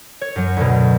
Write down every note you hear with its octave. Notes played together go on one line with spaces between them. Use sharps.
C#5
F#2 F#3
D2 B2